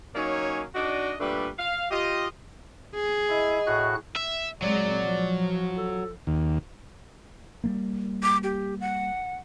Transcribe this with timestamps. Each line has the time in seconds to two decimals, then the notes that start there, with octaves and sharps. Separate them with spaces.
0.15 F#3 A#3 C#4 D#4 C#5 G#5
0.75 D4 D#4 F#4 D5 D#5
1.20 A#2 G3 A3 D4 B4
1.59 F5
1.91 F4 G4 D#5
2.95 G#4
3.30 E4 D#5
3.67 A2 F#4 F#6
4.16 E5
4.62 A#2 F#3 G#3 C4 D5
5.01 F3
5.77 A4
6.27 D#2
7.64 G3 A3 A#3
8.23 D6
8.44 G4
8.81 F#5